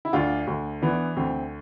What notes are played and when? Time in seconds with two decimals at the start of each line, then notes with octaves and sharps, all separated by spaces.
0.05 E4
0.13 D2 D4 F4
0.47 D2
0.82 E3 B3 D4
1.16 D2 C4